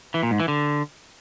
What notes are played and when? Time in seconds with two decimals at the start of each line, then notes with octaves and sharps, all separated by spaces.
0.14 E3
0.23 A#2
0.31 G#2
0.40 E3
0.48 D3